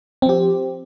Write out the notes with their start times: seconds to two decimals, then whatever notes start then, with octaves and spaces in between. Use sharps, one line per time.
0.22 C4
0.26 F3
0.29 G4